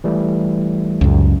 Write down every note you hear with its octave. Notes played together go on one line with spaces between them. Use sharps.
E3 G3 A3
C#2 F#2